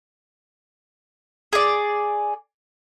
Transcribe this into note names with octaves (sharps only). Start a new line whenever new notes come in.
G#4 D5